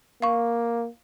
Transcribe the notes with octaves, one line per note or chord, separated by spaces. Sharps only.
A#3 F5 C#6